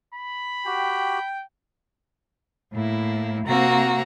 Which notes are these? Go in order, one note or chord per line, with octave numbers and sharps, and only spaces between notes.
B5
F#4 G4 G5
A2 A#3 E4
C3 A#3 C4 F#4 A#5